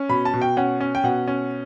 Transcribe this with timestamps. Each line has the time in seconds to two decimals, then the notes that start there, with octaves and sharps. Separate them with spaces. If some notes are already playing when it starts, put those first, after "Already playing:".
Already playing: C#4
0.09 B2 B5
0.25 A5
0.33 B2
0.42 G5
0.57 C#4 F#5
0.80 C#4
0.95 G5
1.04 B2 F#5
1.28 C#4